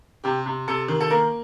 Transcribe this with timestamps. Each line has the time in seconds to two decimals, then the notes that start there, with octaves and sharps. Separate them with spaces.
0.24 C3 G4
0.46 C3
0.68 C3 A4
0.88 D#3
1.00 A4
1.10 A#3 A#4